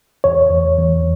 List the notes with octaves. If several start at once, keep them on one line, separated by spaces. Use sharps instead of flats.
E2 C#5
E2
E2